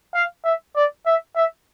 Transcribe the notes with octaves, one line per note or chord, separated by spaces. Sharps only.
F5
E5
D5
E5
E5